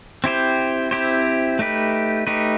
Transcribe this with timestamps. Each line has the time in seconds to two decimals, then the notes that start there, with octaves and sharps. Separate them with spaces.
0.24 C4 E4 G4 C5
0.91 C4 E4 G4 C5
1.59 A3 D#4 G4 B4
2.27 A3 D#4 G4 B4